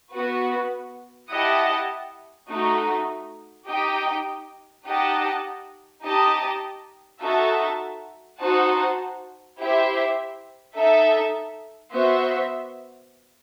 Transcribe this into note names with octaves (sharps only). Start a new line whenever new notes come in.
B3 F#4 B4
E4 G4 D#5 F#5 A5
A3 D#4 F#4
D#4 G4 D#5 G5
D#4 G4 D#5 F#5 A5
D#4 G4 D#5 A5
D#4 F#4 A4 E5 A5
D#4 F#4 C5 F#5 A5
E4 G4 C5 E5
D#4 A4 E5
B3 F#4 C5 E5